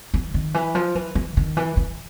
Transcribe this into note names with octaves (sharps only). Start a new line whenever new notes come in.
E3
D#3
E3
F3
E3
E3
D#3
E3
E3